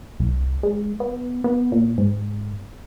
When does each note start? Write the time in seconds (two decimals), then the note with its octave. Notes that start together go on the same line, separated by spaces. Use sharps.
0.20 C2
0.63 G#3
1.00 B3
1.44 B3
1.72 A#2
1.98 G#2